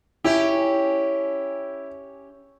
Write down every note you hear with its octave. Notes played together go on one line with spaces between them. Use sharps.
C#4 E4 G4